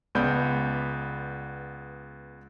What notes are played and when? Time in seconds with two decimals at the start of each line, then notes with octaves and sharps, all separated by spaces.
0.15 C#2 B3 D5 B5 G6